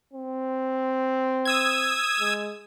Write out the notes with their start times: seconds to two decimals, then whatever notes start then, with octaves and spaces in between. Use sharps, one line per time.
0.13 C4
1.45 D#6 E6 G#6
2.20 G#3